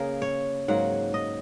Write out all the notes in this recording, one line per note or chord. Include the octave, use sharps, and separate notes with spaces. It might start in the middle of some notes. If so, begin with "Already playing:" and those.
Already playing: C#3 A#3 G#4 A#4
C#5
G#2 F#3 A#3 F#5
D#5